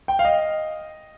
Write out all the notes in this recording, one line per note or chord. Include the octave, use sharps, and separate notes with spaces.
G5
F5
D#5